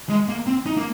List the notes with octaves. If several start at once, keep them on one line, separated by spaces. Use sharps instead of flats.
G#3
A#3
C4
D#4
A#3